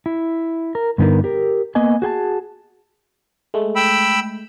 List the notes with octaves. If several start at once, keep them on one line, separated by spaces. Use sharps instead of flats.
E4
A#4
G2 D3 B3 D#4 A#4
G4 A#4
A#3 B3 D#5 G#5
F#4 G#4 G5 A5
G#3 A3
G5 B5 E6